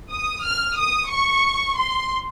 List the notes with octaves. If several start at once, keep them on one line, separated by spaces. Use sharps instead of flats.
D#6
F6
D#6
C#6
C6